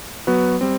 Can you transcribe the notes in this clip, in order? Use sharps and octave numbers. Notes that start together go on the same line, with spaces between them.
F#3 B3 F#4 B4
G3 C4